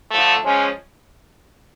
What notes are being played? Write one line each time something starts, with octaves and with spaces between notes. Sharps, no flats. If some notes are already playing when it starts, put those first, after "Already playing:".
D3 F3 A3
F3 G#3 C#4